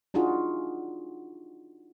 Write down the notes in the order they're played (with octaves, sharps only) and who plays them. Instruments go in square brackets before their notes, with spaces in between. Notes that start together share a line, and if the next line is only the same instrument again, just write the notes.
[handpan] D4 D#4 F4 F#4 G#4